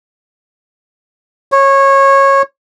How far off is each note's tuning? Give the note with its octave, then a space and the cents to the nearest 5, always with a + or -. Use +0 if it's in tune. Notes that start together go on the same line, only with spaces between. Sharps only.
C#5 -20